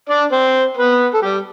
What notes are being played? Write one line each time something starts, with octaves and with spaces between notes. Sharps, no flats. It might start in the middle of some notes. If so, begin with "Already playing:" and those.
D4 D5
C4 C5
B3 B4
A4
G3 G4